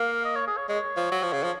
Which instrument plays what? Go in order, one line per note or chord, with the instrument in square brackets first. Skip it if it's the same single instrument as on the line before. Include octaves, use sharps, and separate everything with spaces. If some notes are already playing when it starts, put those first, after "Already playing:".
Already playing: [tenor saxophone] A#3 [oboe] F5
[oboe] D#5
C#5
G#4
C#5
[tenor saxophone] G#3 [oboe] C#5
[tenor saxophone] F3
F#3
F3
C#3
F3